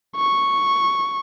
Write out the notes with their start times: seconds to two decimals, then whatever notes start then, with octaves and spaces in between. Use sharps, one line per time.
0.16 C#6